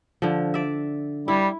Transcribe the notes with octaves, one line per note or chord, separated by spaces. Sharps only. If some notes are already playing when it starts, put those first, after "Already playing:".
D3 F3
D5 E5
G3 E4